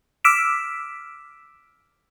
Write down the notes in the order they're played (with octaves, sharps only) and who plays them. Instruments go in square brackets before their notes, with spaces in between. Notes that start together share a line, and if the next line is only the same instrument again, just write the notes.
[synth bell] D6 E6 F6 B6 D7 E7